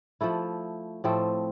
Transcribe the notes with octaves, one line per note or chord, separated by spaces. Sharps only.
F3 A3 E4
A2 F3 A3 C4